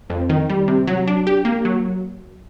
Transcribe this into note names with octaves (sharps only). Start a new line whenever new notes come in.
F2
D#3
G3
C3
F#3
D4
G4
A#3
F#3